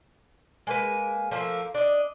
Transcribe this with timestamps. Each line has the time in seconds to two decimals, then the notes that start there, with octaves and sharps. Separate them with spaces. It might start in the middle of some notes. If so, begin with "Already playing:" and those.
0.67 G#3 A#3 B4
1.31 F3 A3 A#3 E5
1.74 D4 D#5